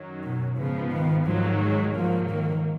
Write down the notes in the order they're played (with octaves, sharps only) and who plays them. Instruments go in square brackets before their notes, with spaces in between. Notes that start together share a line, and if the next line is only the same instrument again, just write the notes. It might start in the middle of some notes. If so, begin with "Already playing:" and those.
Already playing: [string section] F#2 D#3 F#3
[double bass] B2
[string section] G#2 F3 B3 [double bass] C#3
[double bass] D#3
[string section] G#2 D#3 F#3 [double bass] F3
[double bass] G#3
[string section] G#2 F#3 A#3 [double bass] F3
[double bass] D#3